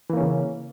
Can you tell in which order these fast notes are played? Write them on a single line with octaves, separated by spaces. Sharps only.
E3 A#3 C#4 C#3